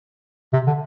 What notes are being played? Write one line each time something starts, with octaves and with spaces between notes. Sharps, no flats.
C3
D3